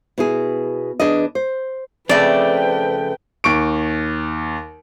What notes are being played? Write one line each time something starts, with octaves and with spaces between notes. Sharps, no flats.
B2 E4 G#4
E2 D4 G#4 B4 D#5
C5
F2 C#3 A3 C4 B4 D5 G5
D#2 C#6 D7